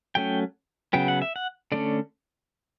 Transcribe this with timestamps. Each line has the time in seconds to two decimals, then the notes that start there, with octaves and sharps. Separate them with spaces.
0.15 F#3 A3 C#4 G5
0.93 C#3 F#3 B3 G5
1.08 F#5
1.22 E5
1.36 F#5
1.72 D3 A3 C#4 D5